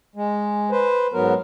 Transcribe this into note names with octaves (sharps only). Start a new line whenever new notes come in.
G#3
B4 C5
G#2 F#3 B3 A#4